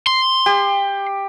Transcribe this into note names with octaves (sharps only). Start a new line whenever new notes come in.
C6
G4